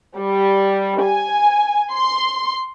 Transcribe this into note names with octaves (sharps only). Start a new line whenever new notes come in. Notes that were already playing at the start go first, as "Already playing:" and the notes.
G3
G#5
C6